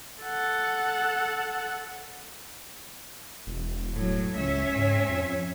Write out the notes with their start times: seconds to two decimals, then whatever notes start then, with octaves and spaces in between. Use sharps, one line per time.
0.23 A4 F#5
3.47 E1
3.93 A2 F#3
4.36 C#2 C#4 E5
4.76 G#2
5.09 F2